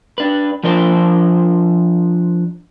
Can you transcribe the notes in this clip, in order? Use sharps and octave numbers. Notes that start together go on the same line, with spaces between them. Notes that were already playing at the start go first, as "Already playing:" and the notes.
D4 B4
F3 D4 A#4 C5